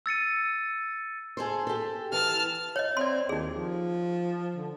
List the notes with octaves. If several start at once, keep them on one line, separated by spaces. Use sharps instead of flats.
E6 A6 C#7 D#7
G#4 A4 C5
G4 A4
E3 A5 F6
C#5 D#5
C4 D5 C6
D#2 D#4 G#4
F3
D3